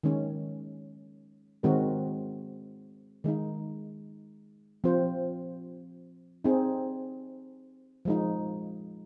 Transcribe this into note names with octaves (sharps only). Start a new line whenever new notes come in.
D#3 G#3 C#4
D#3 G#3 C4 F#4 A#4
D#3 G#3 D#4
F3 C4 F4 C5
C4 D#4 G#4
F3 G#3 D#4